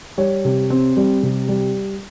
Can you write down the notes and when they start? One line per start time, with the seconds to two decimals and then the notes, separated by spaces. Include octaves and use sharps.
0.18 G3 C#5
0.45 C3
0.70 C4
0.97 G3
1.23 C3
1.49 G3